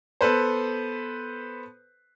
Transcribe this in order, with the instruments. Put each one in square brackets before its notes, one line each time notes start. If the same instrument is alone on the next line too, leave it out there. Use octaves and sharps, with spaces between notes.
[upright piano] B3 A4 B4 C5